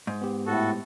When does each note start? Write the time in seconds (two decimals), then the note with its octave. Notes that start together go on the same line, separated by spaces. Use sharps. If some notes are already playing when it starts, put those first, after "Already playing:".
0.07 G#2
0.22 B3 G4
0.46 A2 F#4 A4